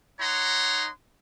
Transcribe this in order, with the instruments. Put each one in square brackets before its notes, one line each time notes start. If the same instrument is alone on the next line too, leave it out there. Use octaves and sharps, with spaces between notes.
[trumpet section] D#4 C#5 F#5 A#5 C6